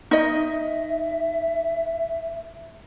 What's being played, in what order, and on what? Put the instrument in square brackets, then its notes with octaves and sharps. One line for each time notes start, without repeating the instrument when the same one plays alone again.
[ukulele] D#4 D#5 [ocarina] E5